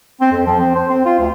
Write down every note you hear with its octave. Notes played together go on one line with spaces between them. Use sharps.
C4
F2
F3
C4
C5
C4
F4
D2